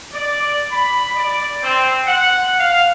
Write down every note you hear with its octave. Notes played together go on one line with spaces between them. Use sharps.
D5
B5
D5
C4
F#5
F5